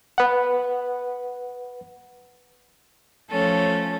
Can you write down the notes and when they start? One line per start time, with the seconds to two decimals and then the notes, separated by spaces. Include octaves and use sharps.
0.18 B4 F#5
3.30 F3 A3 C#4 A4